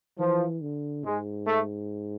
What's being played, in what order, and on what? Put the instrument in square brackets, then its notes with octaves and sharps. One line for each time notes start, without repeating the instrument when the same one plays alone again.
[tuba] E3 [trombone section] F3
[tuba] D3
[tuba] G#2 [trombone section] G#3
[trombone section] A3